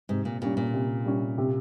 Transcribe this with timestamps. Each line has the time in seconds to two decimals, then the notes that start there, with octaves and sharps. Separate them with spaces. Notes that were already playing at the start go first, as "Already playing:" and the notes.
0.09 G#2 C3
0.25 A#2
0.41 A#2 G3 C#4
0.57 A#2
0.73 C3
1.05 G3 C#4
1.38 C3